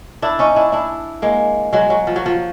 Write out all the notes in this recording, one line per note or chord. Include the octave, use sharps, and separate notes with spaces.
D4 E4
C#4 D#4
D4 E4
D4 E4
G#3 A#3
F#3 G#3
F#3
F3
F#3
F3